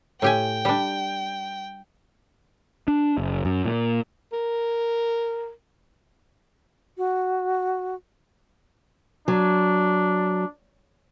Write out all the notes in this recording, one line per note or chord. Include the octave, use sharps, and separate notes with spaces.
A2 G4 G5 G#5
G3 D4
D4
F#1
F#2
A#2
A#4
F#4
F#3 D4